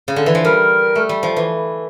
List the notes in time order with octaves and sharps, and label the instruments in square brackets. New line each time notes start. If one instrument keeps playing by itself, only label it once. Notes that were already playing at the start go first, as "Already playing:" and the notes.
[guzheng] C#3
D3
E3
F3
[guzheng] G3 [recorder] A#4
[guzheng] A3
G3
F3
E3